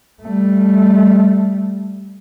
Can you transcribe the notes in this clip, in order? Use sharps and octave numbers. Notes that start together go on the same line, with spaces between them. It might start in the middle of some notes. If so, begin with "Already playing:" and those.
G3 A3